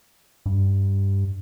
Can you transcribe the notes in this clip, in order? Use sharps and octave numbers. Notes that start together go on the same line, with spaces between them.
G2